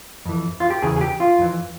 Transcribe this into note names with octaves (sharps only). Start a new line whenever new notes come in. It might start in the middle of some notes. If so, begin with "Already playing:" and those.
F2 E3
F4
G4
E2 C#3 E3 G#4
G#4
G4
F4
F2 E3